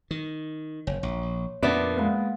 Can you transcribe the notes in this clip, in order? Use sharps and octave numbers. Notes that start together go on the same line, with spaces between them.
D#3
F#1 C#5
A#1
F2 A#2 B3 D4 A#4 D5 E5
G#3 A#3 B3 F5 F#5